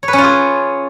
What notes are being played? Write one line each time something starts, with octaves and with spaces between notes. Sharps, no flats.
C#5
B4
C#4
F4
G#4